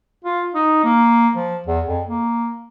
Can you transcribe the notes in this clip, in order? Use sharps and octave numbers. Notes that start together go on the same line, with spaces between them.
F4
D#4
A#3
F3
E2
F2
A#3